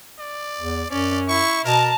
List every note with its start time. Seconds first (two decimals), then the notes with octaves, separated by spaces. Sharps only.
0.19 D5
0.60 E2
0.91 F#2 C#4 D5
1.28 E4 C#6
1.65 B2 A#4 A5 A#5